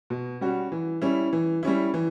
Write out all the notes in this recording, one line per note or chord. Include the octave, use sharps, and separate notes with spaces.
B2
G3 C#4 F#4
E3
G3 C#4 E4
E3
G3 C#4 E4
E3